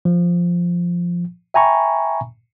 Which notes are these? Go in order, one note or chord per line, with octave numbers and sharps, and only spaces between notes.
F3
E5 G5 G#5 A#5 B5 C#6